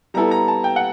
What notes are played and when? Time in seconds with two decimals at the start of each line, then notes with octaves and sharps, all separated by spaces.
0.14 G3 B3 E4 A4 A#5
0.31 A#5
0.48 A5
0.64 G5
0.76 F#5